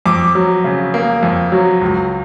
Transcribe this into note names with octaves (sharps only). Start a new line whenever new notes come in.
F2 D6
F#3
C#3
A#3
F2
F#3
C#2